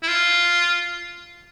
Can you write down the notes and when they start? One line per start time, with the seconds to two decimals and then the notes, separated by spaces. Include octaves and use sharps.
0.03 E4
0.08 F4